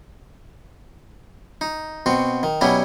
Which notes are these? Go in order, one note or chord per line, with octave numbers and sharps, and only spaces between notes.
D#4
B2 C4 F#4
D#3
B2 F#3 G3 C#4 E4